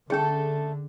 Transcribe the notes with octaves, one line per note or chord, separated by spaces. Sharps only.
D3 A3 C#4 G#4 A4